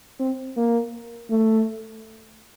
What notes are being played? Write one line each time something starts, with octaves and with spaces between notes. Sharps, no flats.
C4
A#3
A3